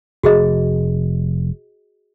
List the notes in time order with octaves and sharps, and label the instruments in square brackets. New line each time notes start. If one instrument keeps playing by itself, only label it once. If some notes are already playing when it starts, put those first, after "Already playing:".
[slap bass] F1 [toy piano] F#4 G#4 D#5